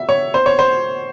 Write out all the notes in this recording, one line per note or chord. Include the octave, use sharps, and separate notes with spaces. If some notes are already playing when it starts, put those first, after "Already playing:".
Already playing: E5
C#5
C5
C#5
C5